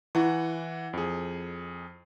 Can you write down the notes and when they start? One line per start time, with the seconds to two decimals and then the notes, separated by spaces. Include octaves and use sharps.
0.15 E3 E4 F#5 C#6
0.93 F2 G#4